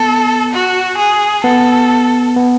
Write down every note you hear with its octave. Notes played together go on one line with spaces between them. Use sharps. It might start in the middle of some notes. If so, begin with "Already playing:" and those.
Already playing: B3 A4
F#4
G#4
B3 A4
B3